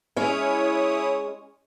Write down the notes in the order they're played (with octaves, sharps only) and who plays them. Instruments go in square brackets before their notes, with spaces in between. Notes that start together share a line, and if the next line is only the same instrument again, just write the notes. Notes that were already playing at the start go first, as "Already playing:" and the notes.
[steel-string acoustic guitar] G#3 C#4 [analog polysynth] E4 C#5 D#6